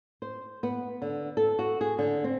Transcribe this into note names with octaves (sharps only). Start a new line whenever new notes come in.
C5
B3
D3
A4
F#4
G#4
D3
C4